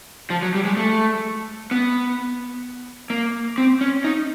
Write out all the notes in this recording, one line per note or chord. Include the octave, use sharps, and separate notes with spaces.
F3
F#3
G3
G#3
A3
B3
A#3
C4
C#4
D#4